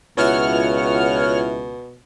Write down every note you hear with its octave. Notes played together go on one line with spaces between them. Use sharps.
C#2 B2 E4 F4 C#5 E5 F#5 F6